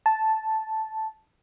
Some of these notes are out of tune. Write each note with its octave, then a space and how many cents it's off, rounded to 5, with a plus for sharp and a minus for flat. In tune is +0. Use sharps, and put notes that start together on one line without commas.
A5 -5